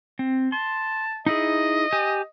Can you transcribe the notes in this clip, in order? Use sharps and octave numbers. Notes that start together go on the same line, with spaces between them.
C4
A5 C6
D#4 E4 G#4 D#5
G4 G#5